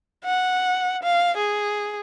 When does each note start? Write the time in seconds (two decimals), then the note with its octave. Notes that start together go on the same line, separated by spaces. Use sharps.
0.25 F#5
1.03 F5
1.37 G#4